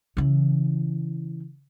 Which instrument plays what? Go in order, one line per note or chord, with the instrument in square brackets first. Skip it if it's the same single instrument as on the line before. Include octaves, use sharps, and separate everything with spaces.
[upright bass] C#3 E3